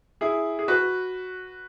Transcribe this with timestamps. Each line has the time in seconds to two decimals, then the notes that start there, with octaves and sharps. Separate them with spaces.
0.21 E4 G#4
0.59 G#4
0.68 F#4 B4